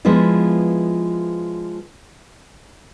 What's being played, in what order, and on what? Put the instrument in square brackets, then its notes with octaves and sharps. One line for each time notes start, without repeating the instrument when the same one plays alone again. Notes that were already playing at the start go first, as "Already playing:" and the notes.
[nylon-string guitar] F3 G#3 B3 E4 F4